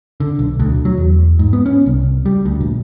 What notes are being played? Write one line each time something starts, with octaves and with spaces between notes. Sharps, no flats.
D3
B1
D2
F#3
E2
G#2
B3
C#4
C2
G3
D2
A#1